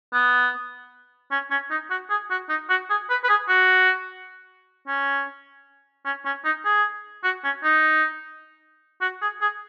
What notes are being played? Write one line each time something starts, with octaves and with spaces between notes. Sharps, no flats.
B3
C#4
C#4
D#4
F#4
G#4
F#4
D#4
F#4
G#4
B4
B4
G#4
F#4
C#4
C#4
C#4
D#4
G#4
F#4
C#4
D#4
F#4
G#4
G#4